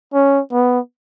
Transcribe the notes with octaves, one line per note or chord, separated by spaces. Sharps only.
C#4
B3